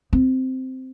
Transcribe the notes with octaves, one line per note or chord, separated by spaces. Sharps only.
C4